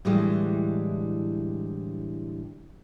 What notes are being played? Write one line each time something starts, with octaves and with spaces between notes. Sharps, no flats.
A2 D3 E3 G3 G#3